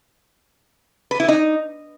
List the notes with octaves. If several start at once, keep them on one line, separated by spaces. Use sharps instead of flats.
B4
E4
D#4